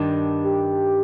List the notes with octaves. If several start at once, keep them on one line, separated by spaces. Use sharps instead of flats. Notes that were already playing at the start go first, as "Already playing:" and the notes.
Already playing: G2 D#3 G3 D4
G4